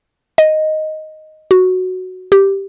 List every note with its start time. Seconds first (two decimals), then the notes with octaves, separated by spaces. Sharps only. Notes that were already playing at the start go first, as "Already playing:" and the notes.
0.38 D#5
1.51 F#4
2.32 G4